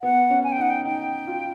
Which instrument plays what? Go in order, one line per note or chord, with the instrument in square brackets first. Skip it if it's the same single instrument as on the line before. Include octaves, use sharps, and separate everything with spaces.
[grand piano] B3 [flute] F#5
[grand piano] C#4
[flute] G#5
G5
[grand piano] D#4 [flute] F#5
[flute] G5
[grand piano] D#4 [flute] G5
[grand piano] F4